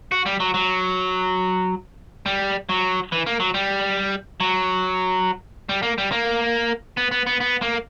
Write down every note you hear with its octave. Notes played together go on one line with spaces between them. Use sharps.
F#4
G3
F#3
F#3
G3
F#3
E3
A#3
F#3
G3
F#3
G3
A#3
G3
A#3
B3
B3
B3
B3
A#3